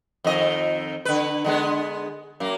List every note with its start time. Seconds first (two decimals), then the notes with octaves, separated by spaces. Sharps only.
0.24 F2 D#3 D#5
1.05 D3 B4
1.44 D3 G#3 B3
2.40 F#2 A#3